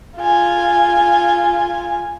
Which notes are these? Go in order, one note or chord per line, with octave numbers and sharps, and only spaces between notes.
F4 G#5